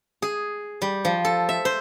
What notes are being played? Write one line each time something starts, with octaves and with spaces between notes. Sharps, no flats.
G#4
G3
F3
A4
E5
C5